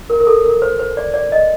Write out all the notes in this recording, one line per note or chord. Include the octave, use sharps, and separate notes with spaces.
A#4
A#4
A4
A#4
C5
C5
D5
D5
D#5